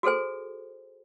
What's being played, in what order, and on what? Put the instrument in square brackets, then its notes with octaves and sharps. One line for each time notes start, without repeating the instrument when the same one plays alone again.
[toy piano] F#4 G#4 A4 C5 G#5